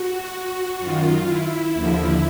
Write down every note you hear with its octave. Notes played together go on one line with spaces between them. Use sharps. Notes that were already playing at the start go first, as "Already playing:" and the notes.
Already playing: F#4
F#2 D#3 F4
E4
D#2 D3 F3